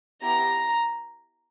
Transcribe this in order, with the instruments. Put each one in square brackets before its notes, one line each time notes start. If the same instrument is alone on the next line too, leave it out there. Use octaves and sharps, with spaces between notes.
[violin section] B3 E4 G4 A#5